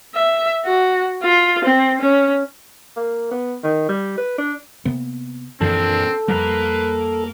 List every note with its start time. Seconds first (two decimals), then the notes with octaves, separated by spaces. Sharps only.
0.15 E5
0.65 F#4
1.23 F4
1.64 C4
2.01 C#4
2.97 A#3
3.31 B3
3.64 D#3
3.89 G3
4.18 B4
4.38 D4
4.85 C3 A#3 B3
5.61 F#2 A#2 E3 F3 C4 D4 A4
6.28 F2 F3 G3 A#3 B4 A#5